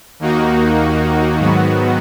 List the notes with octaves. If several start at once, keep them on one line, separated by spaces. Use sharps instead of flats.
D#2 D#3 A#3 D#4 F#4
G#2 D#3 F#3 B3 F#4